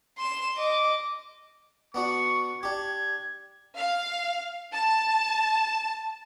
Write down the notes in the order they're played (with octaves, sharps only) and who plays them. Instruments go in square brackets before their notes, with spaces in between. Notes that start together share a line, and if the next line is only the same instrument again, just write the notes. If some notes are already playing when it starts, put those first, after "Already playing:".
[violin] C6 E7
D#5 D6
[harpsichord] B3 D4 F#4 [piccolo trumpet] C#6
[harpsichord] D4 G4 [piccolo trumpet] G#6
[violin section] F5
A5